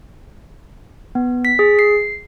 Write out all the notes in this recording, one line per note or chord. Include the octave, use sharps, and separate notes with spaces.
B3
B6
G#4
C7